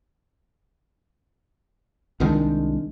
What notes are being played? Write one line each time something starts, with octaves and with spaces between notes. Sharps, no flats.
C2 D#3 G#3 D4